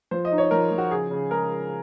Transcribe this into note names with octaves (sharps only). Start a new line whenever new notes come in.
F3 C5
D#5
D#4
C#5
F3 A#4
F3
F#4
C#3 G#4
C#3
G#3 A#4